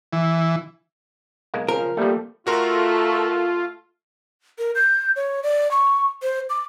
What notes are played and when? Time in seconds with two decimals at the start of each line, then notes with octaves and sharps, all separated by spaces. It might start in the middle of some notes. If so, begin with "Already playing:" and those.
0.13 E3
1.54 B1 G#3 A#3
1.68 C#3 F3 A#4
1.97 F3 G3 A3 A#3 A4
2.47 A3 F4 F#4 A4 A#4 C6
4.58 A#4
4.75 G6
5.16 C#5
5.43 D5
5.71 C#6
6.22 C5
6.50 D6